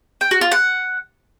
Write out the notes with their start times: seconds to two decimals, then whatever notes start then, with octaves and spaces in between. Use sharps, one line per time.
0.21 G5
0.31 F#4
0.41 F4
0.52 F#5